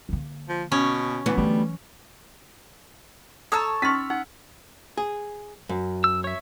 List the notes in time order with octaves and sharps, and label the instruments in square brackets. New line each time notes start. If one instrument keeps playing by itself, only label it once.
[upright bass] D3 A#3
[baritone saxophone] F3
[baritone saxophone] B2 [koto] C#4
[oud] D2 B3 [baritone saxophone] E3
[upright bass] E3 F#3 [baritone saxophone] G3
[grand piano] A4 E6 [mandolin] C#5 A5 [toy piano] A#5 D#6
[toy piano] C#4 D#4 C6 [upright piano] C#6 F6 B6 [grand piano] A6
[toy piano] D#4 [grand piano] F#5
[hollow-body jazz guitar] G#4
F#2
[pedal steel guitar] E6
C#5 E5